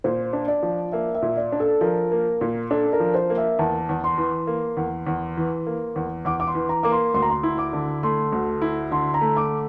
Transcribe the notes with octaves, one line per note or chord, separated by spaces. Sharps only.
A#2 C5
D4
D5
F3
A#3 E5
E5
A#2
D5
D4
A4
F3 A#4
A#3
A#2
D4 A4
A#4
F3
C5
A#3
E5
E2 A5
E2
C6
E3
A#3
E2
E2
E3
A#3
E2
E2 D6
D6
C6
E3
A#5
A#3 D6
C6
D2 C6
A#5
C6
E4
D6
D3
A3 C6
D2
E4
D3 C6
A#5
A3
D6